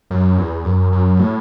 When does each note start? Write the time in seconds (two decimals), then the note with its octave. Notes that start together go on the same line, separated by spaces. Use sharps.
0.11 F#2
0.38 E2
0.65 F#2
0.92 F#2
1.19 A2